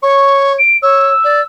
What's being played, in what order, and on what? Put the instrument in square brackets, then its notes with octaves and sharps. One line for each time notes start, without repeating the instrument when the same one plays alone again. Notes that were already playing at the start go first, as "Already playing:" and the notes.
[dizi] C#5 [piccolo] C#6
[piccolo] D7
[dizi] C#5 [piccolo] E6
[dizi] D5